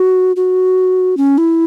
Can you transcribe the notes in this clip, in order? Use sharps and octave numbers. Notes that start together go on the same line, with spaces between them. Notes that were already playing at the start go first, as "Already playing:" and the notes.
Already playing: F#4
F#4
C#4
E4